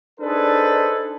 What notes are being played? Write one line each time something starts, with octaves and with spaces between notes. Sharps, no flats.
D4 D#4 G#4 A4 B4 C5